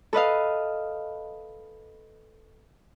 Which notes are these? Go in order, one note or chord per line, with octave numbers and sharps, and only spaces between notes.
A4 B4 D#5 F5